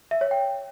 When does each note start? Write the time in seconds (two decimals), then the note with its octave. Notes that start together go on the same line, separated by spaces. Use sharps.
0.11 E5
0.21 C#5
0.31 G5